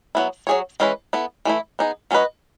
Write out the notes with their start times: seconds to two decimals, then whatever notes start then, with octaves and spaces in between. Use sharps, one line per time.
0.15 F#3 B3 E4
0.47 F#3 C#4 G#4 C#5
0.80 E3 G#3 C#4 E4 B4
1.13 B3 E4 A4
1.45 E3 A3 E4
1.79 B3 D#4 G#4
2.11 F#3 C#4 G#4 B4 D#5